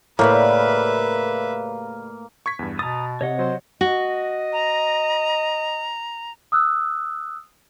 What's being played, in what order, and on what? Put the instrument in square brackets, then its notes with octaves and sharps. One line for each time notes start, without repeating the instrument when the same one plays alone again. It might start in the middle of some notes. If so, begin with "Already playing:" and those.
[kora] A2 [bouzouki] C#3 F#3 G3 [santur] A#3 [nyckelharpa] B4 E5
[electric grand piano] C#6 G#6 B6
E2 G2
[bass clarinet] B2 [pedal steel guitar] A#5 D#6 [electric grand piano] A6
[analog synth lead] C3 [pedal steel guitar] C#5 D#5 F#5
[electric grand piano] F#3 [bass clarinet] C5
[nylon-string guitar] F#4 [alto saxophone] D#5
[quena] A#5
[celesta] D#6 E6 F#6